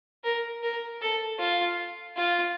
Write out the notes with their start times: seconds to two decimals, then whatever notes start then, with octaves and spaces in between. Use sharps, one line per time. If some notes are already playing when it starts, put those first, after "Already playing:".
0.24 A#4
0.63 A#4
1.01 A4
1.39 F4
2.17 F4